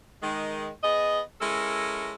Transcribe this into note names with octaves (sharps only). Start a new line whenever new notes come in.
D#3 G#3
B3 G#4 D#5
G#3 C#4 E4 A4 A#4